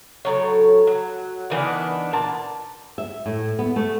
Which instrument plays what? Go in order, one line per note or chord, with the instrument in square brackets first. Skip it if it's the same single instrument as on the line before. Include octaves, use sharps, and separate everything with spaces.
[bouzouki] A2 F#3 C#5
F#3
D#3 E3 B3 D4
A#2 A5
[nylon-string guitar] E5
A2
B3
A3